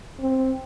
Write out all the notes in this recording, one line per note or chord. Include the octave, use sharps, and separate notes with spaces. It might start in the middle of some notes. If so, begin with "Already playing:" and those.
C4